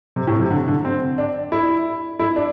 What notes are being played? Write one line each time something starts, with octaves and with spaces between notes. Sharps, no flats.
C3
A2
C3
D3
D3
C4
D4
E4
E4
D4